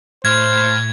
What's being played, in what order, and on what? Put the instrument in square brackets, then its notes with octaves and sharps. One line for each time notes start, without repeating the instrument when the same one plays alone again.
[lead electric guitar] A2 [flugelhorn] C5 [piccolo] F6 [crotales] G#6